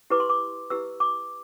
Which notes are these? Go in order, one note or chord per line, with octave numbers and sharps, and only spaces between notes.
E4 G4 B4 D6
C6
D6
E4 G4 B4 E6
D6